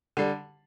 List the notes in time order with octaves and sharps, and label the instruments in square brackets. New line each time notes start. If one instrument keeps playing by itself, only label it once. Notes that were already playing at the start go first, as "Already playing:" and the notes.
[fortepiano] D3 G3